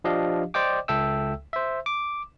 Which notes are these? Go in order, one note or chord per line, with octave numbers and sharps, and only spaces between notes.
F3 D4 G4 D#5 F5
C5 D5 D#5 G5 D6
C#2 A4 E5 G5 E6
C5 E5
D6